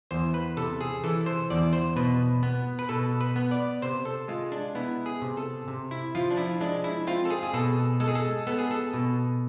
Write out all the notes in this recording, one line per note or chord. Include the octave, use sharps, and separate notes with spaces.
E2 C5
B4
C3 A4
G#4
E3 A4
C5
E2 D5
C5
B2 B4
B3
B4
B2 A4
B4
B3
D5
C3 C5
A4
G#3 F4
D4
B3 E4
G#4
C3
A4
C3
E4
F3 F4
D4
E4
G#3 D4
E4
C4 F4
A4
G#4
G#4
B2 A4
G#3 A4
G#4
A4
B3 A4
G#4
A4
B2